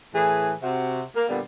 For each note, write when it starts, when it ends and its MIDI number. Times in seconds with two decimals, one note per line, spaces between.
0.14 0.54 45
0.14 0.54 52
0.14 0.54 68
0.62 1.02 48
0.62 1.02 66
1.16 1.28 58
1.29 1.41 46
1.29 1.41 50
1.29 1.41 55
1.29 1.41 59